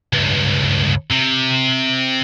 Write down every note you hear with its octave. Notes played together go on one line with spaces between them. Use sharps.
C#2 G2
C3